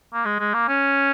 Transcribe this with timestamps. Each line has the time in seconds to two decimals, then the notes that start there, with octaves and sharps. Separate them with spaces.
0.14 A#3
0.25 G#3
0.40 G#3
0.54 A#3
0.68 C#4